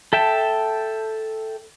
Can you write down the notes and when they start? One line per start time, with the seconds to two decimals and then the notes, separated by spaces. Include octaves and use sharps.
0.13 A4 E5 G5 A5